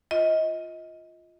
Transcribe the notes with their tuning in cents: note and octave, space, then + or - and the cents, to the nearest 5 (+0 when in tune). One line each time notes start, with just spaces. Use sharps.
F4 +0 D#5 +25